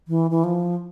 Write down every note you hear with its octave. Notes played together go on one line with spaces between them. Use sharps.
E3
E3
F3